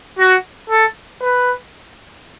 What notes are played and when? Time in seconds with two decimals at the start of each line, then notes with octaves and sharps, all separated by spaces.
0.19 F#4
0.69 A4
1.22 B4